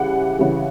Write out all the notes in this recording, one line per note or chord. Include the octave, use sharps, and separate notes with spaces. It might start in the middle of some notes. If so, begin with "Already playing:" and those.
Already playing: C#3 E3 G3 F#5
C#3 E3 G3